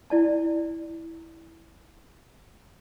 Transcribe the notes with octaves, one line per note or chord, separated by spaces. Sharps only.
E4 D5 A5